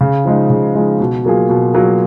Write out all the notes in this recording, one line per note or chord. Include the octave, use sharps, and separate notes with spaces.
C#3
F3 G#3 D#4
C#3
F3 G#3 D#4
B2
F#3 A#3 F4 G#4
B2
F#3 A#3 F4 G#4